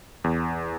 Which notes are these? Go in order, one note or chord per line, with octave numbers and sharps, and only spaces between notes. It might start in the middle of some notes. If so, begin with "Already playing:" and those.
E2